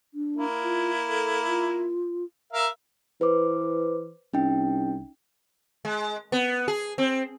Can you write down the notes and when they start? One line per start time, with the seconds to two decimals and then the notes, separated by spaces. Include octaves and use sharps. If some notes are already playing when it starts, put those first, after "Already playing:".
0.14 D4
0.36 A#3 E4
0.62 F4
1.08 A4
1.47 F4
2.53 A#4 E5 F5
3.21 E3 B4 C5 D6
4.34 C2 C#4 D#4 G5
5.85 G#3
6.32 B3
6.68 G#4
6.98 C4